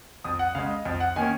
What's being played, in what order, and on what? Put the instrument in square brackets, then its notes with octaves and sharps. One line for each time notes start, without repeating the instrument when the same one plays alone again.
[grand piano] F2 D#6
F#5
C#3 G#3 F5
D#5
F2
F#5
D#3 A#3 C#4 G#5